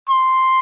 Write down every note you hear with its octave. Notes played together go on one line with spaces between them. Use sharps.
C6